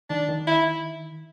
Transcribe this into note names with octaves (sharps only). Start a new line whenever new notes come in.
D#3 D4
D#3
E4